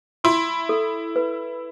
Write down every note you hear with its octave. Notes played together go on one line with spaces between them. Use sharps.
E4 C6
A4
B4